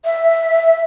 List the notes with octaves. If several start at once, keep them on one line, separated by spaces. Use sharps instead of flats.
E5